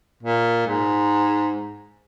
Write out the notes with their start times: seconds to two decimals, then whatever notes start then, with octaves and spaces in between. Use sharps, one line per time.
0.23 A#2
0.67 G#2